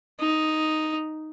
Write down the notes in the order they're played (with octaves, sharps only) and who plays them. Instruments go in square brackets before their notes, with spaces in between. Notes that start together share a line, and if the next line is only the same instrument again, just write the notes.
[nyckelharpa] D#4